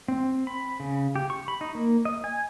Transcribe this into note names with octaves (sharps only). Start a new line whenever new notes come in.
C4
B5
C#3
G4
C#6
B5
D#4
A#3
D#5
G#5